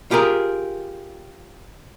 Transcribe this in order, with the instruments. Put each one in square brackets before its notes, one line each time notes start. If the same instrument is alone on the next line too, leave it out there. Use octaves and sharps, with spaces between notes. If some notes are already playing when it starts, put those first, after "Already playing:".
[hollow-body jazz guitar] F4 G4 G#4 A#4